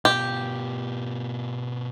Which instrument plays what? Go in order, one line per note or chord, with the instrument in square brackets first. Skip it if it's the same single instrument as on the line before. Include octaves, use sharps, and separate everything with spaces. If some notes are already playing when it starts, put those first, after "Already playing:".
[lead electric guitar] B2 F4 [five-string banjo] G4